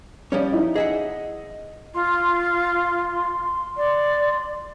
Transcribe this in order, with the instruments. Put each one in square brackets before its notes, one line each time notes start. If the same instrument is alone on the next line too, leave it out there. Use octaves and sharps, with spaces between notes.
[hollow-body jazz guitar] F3 G3 C#4 [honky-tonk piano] C#5 D5
[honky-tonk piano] D#4 E4 D#5
[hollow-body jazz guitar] G#4 E5 F#5 [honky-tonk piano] D#5
[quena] F4 [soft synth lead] C6
[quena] D5 [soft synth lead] C6